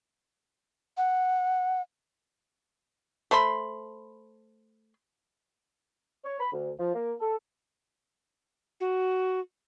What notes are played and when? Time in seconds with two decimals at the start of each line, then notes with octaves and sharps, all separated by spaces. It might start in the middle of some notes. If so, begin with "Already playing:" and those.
0.97 F#5
3.31 A3 C5 B5 C6
6.25 C#5
6.40 B5
6.53 D2
6.79 F3
6.95 A#3
7.21 A4
8.80 F#4